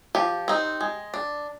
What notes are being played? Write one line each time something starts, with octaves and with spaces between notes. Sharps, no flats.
F3 G4
C4 D#4
G#3
D4